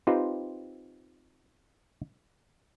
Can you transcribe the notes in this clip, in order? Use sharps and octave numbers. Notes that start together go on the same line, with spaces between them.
C4 D#4 F4 G4 B4 C5